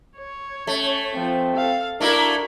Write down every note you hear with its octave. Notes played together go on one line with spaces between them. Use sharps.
C#5
A3 C#4
F3 C4
A4 F5
A3 A#3 D4 E4 F#4 A#4